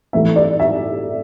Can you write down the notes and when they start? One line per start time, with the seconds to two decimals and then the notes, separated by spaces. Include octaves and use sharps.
0.13 A2 E3 A3 E5
0.36 D5
0.60 E5